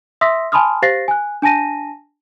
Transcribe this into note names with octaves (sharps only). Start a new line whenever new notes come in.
E5 C6 D#6 E6 A#6 B6
G#5 A5 B5 C6 D#6 F6
G4 C5 F5 A6 A#6 C7
G#5 F#6
D4 G#5 A5 A#6 D#7